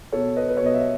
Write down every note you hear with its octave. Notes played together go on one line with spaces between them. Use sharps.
B2 A4 C#5
B4 D#5
B4
B2 C#5
D#5
E5